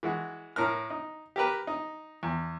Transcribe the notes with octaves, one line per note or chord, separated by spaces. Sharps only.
E3 G#3 F#4
A2 A#4 F6
D#4
G4 A#4 B4
D#4
E2